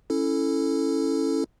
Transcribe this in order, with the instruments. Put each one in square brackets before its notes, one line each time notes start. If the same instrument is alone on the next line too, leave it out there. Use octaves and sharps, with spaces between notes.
[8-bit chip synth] C#4 E4 A4